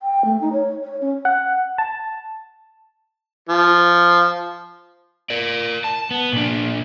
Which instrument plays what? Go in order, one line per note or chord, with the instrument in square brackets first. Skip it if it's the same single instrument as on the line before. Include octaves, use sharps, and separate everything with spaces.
[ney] G5
A3
D#4
C#5
C#5
C#4
[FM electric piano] F#5
A5
[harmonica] F3
[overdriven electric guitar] A#4 D5
A5
B3
A#2 D4